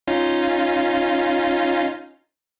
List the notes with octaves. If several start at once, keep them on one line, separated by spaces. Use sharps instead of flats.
C#4 D#4 F4